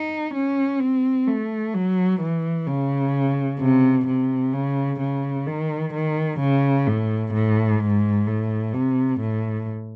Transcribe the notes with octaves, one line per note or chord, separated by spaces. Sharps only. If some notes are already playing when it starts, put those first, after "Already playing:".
Already playing: D#4
C#4
C4
A3
F#3
E3
C#3
C3
C3
C#3
C#3
D#3
D#3
C#3
A2
A2
G#2
A2
C3
A2